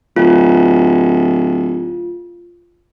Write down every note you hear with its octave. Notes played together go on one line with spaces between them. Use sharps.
D1 F4